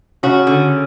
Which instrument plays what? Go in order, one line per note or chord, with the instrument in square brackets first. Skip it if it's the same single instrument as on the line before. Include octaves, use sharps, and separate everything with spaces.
[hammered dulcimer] C#3 [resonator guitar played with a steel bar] F#4
[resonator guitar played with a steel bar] D3